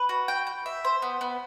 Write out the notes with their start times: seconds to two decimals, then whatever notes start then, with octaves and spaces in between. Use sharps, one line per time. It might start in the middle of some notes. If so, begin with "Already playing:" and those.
Already playing: B4
0.09 F#4
0.28 G5
0.47 G5
0.66 E5
0.85 C5
1.02 B3
1.21 B3